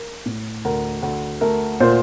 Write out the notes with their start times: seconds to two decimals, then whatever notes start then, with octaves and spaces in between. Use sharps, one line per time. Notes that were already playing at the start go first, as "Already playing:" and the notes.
Already playing: A#4
0.26 A2
0.65 D2 A#4
1.02 D2
1.41 A3 A#4
1.80 A#2 C5